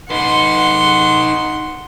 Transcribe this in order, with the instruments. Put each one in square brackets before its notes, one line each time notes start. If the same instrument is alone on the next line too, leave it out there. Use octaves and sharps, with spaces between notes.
[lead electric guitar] D#4 B4 [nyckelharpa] F#5 C6